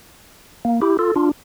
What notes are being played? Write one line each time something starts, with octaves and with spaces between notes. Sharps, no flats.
A#3
E4 G4
F4 A4
D4 F4